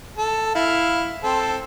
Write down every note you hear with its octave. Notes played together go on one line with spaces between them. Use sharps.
A4
E4 F5
C4 A4